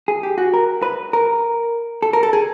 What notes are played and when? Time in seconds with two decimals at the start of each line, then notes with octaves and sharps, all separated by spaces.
0.08 G#4
0.23 G4
0.38 F#4
0.54 A#4
0.82 B4
1.13 A#4
2.02 A4
2.13 A#4
2.23 A4
2.33 G#4